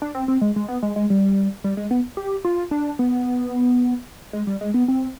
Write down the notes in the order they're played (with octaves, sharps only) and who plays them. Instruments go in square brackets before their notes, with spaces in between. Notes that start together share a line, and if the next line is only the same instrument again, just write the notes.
[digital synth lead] D4
C4
C4
G#3
G#3
B3
G#3
G#3
G3
G3
G#3
B3
G4
F4
D4
B3
G#3
G3
G#3
B3
C4